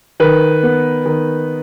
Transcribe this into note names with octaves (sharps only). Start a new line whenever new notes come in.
D#3 B4
B3
D#3